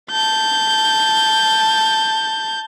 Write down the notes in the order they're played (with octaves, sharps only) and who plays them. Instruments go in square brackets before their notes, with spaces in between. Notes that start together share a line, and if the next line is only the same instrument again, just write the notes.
[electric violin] A5 G6